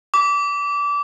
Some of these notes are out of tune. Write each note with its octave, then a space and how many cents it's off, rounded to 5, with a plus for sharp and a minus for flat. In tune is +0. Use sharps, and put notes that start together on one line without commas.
D6 -25